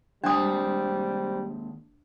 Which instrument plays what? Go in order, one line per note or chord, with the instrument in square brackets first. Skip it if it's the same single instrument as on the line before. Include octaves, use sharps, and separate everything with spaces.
[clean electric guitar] D#2 G#3 A5 [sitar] C3 C4 [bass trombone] G3 [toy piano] D4 D#6